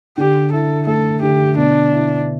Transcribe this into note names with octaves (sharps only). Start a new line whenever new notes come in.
D3 G4
E4 A4
A3 A4
D3 G4
B2 D4
E4